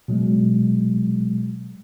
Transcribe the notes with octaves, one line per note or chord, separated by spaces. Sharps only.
B2 F#3 G#3